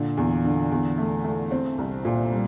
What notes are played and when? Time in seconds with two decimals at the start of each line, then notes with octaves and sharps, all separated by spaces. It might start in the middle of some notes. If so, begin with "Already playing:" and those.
Already playing: A#2 D3
0.17 E2
0.44 D3
0.72 E2
0.98 A3
1.24 A3
1.51 C4
1.78 C2
2.05 A#2
2.32 G3